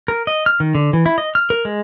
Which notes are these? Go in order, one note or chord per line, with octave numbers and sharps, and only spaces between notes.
A#4
D#5
F6
D#3
D3
E3
E4
D#5
F6
A#4
G#3